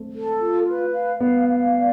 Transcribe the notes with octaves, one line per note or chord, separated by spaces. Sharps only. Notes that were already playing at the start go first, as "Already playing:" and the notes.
Already playing: A3 C4
A4
F4
B4
F5
B3 F5
F5
D5